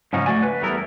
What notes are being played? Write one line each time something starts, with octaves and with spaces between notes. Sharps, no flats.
G#2 C#3 F3 C#4 D#4
A3 F#4 D5 G#5
B4
E2 G3 A3 B3 E4 A#4